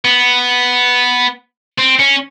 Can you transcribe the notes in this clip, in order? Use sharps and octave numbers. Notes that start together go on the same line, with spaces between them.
B3
C4
C#4